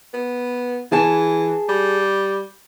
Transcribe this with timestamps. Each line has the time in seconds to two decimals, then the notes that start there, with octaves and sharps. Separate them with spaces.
0.14 B3
0.92 E3 G#4 G#5 A5
1.69 G3